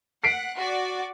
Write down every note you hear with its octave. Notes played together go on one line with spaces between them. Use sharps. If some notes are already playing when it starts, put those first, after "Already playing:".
F#5 B6 C7 D7
F#4 D5